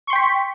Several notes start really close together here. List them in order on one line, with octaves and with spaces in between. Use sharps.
C#6 C6 G5 B6